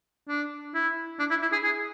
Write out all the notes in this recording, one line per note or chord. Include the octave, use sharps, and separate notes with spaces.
D4
E4
D4
E4
E4
G#4
G#4